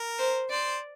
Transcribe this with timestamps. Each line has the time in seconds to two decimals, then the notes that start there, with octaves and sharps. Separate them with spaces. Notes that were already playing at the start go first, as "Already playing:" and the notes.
Already playing: A#4
0.19 C5
0.50 C5 D5